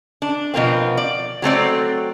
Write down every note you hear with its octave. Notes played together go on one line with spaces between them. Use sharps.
D4
B2 F3 A#3 C4
D5
F#3 A3 C4 D5